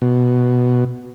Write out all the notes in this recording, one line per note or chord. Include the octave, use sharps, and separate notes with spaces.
B2